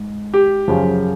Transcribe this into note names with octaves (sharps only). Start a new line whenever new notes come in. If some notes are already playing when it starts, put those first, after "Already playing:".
Already playing: G#2
G4
F#2 C#3 F3